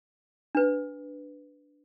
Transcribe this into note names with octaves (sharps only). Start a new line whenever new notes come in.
D4 B4